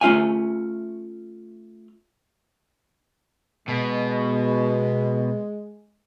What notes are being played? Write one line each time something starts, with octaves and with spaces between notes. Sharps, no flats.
A3 C#4 F4 E5 F5 G#5
B2 G#3